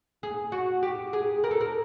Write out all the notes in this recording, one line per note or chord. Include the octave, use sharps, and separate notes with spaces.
G#4
F#4
G4
G#4
A#4
A4
A#4